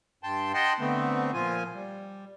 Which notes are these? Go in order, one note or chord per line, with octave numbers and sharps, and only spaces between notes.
G2 G5 A5 C6
D#5 F#5 G5 A5 C6
D3 A3 B3 C4
A#2 F3 F4 G#5
G3